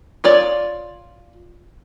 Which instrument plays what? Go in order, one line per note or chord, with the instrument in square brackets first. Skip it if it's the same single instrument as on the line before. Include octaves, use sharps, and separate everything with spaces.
[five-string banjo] F4 C#5 D5